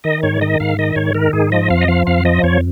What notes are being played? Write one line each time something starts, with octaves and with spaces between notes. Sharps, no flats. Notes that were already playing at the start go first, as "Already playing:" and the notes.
D#3 D#5
G#2 C#5
D#3 D#5
G#2 F5
D#3 D#5
G#2 C#5
D#3 A#4
G#2 G#4
F3 D#5
F2 F5
D#5
F3 F5
F2 F5
F3 D#5
F2 C#5